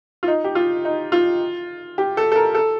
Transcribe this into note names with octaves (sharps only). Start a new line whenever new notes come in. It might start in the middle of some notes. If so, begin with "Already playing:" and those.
F4
D#4
G4
F4
D#4
F4
G4
A4
A4
A#4
A4